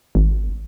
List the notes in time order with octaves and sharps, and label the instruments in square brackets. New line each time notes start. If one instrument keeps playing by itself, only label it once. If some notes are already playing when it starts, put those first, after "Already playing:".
[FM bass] G#1